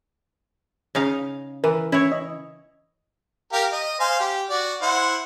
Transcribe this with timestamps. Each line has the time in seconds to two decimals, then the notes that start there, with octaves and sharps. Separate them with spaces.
0.95 C#3 D#4 F5
1.64 E3 A#4
1.92 C#4 E4 C#5
2.12 D#5
3.53 G4 A#4 F5
3.72 D#5
4.00 C5 F5 G#5
4.20 G4
4.50 F#4 D5
4.82 E4 C5 F#5